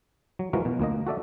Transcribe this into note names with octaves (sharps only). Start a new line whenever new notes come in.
F#3
E3 F3 G#3 F#4 A#4
B2
D2 A#3 D#5
F#4 A4 D5 E5